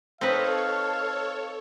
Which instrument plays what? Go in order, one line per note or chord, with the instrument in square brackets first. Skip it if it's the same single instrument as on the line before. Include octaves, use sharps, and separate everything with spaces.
[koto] C4 D#4 B4 [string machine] A4 C#5 [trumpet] F5